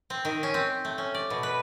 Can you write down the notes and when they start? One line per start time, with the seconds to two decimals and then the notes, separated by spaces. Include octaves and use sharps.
0.10 C4
0.25 D#3
0.43 C#4
0.54 C4
0.85 A3
0.98 C#4
1.14 D5
1.30 B2
1.43 B4